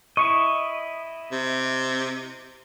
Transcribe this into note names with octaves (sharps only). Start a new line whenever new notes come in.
E4 D#5 C#6
C3